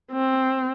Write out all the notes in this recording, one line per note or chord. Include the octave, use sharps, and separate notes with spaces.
C4